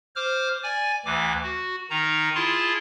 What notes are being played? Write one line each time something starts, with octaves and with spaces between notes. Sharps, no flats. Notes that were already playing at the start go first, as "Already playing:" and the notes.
C5 D6 F6
D5 G#5
D2 E3 D6
F#4
D#3 D#4 A#5
E4 F4 G#4 A5 C6